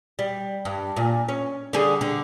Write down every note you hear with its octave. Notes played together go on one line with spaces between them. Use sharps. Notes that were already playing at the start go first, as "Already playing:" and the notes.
G3
G2
A#2
C#4
D3 G3 G#4
D3